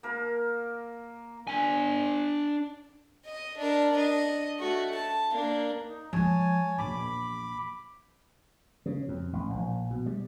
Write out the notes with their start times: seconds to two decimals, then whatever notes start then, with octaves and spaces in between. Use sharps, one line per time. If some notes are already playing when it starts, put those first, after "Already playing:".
0.03 A#3 A#4
1.47 D4 G#5
3.25 D#5
3.57 D4 A#4
3.93 D4 D#5
4.58 A3 F#4
4.95 A5
5.31 A#3 D4
5.88 D#4
6.13 F3 G#3 C#5 G#5 A5
6.78 A#1 E2 B5 D6
8.86 C#3
9.08 F2
9.33 A1
9.50 A#1
9.90 B2
10.06 G3